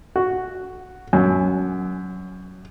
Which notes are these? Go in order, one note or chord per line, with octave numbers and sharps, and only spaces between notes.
F#4
F#2